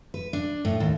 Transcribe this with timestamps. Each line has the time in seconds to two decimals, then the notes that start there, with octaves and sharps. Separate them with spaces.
0.14 B4
0.33 D4
0.65 A2
0.80 D#2